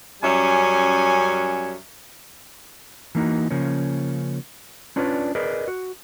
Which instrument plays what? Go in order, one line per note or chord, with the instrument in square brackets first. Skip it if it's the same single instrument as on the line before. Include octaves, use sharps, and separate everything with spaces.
[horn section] F#2 G3 C#4 E5 G#5
[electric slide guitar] E3 A#3 D#4 F#4
C#3 F3 A#3 C#4
C#4 D4 F4 B4 C#5 D5
G#4 A#4 B4 D5 D#5
F#4